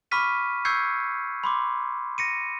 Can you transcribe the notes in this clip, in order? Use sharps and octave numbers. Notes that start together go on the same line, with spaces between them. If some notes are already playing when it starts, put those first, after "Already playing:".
B5 C#6 D6 F6 B6 D#7
C#6 E6 G6 G#6 C7 C#7
B5 C6 D6
A#6 C#7 D#7